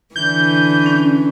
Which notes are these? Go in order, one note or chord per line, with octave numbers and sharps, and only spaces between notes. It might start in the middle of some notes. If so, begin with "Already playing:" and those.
D3 E3 G6
C#4